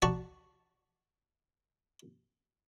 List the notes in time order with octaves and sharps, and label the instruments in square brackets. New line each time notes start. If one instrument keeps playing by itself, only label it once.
[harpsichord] F#4 D5 A5 A#5 C#6